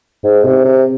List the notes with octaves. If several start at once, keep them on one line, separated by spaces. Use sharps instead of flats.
G#2
C3
C3